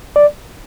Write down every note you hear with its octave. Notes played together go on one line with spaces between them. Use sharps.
D5